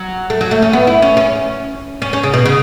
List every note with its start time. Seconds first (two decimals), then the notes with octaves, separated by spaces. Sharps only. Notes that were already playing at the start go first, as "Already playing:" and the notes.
Already playing: F#3
0.30 A3
0.41 F#3
0.51 A3
0.62 C#4
0.73 B3
0.87 E4
1.02 C#4
1.17 C#4
2.02 C#4
2.13 C#4
2.23 C#3
2.34 B2
2.45 C#3